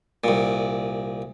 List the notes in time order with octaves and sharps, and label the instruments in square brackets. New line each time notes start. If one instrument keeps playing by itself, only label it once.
[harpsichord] C2 A#2